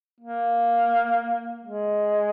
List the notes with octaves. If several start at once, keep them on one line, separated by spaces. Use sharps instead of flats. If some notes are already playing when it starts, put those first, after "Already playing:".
A#3
G#3